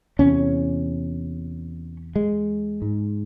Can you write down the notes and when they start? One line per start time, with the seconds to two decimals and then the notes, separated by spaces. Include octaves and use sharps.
0.19 E2 C3 C#4
2.16 G#3
2.82 G#2